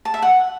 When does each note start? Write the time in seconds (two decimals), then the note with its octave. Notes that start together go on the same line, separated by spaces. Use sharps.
0.05 A5
0.14 E5
0.22 F#5